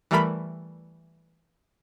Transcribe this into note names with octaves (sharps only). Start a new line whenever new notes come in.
E3 G3 A3 A#4 B5 B6